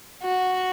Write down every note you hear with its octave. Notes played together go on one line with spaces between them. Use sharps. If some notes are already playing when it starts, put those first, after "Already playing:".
F#4